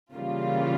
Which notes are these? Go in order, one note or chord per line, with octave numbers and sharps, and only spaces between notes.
C#3 E3 G3 A#3 F4